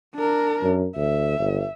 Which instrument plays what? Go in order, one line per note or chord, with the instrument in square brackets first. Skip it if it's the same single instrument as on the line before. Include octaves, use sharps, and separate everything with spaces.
[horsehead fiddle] D4 A#4
[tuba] F#2
[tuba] D2 [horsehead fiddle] E5
[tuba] G1